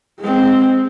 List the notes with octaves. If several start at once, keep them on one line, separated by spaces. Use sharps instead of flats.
G#3 C4